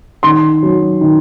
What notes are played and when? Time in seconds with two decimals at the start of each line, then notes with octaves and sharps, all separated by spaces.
0.23 D#3 C6
0.63 F#3
1.01 D#3